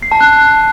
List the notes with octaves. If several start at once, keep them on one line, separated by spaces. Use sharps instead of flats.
C7
A5
F#6